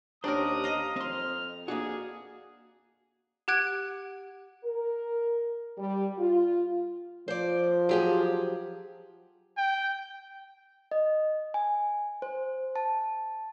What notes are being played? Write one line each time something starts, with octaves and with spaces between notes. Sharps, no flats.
D#2 C#4 D4 G4 A#4 C5 A#5 D#6
D#5 F5
F2 C4 C6 F6
A#3 D4 F#4 G#4
G4 F#5 F#6 G#6 D7
A#4
G3
F4
F3 C5 D5
F#3 G4 G#4
G5
D#5
G#5
C5
A5